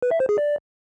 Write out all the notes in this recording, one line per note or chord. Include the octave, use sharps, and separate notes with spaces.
B4
E5
C5
G#4
D5